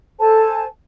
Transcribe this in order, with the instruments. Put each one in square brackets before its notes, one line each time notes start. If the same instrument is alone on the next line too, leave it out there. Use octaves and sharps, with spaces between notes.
[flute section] A4 C5 G#5 A5